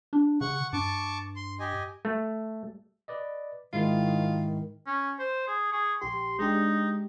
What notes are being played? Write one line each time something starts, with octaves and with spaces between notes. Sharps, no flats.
D4
C#3 F#5 C#6
G2 A5 C#6 D6
C6
G4 D#5 G#5
A3
B4 D5 D#5
G#2 D#3 G#3 E4 F4
C#4
C5
G#4
G#4 C#6
A#1 G4 C6
G#3 D4 D#4 G4